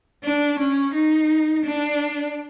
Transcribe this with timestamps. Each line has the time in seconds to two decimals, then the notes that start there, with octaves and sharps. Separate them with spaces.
0.24 D4
0.59 C#4
0.94 D#4
1.64 D4